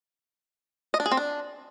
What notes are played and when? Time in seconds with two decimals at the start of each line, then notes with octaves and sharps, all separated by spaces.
0.94 D#5
1.00 D4
1.06 G#4
1.12 C4
1.17 D4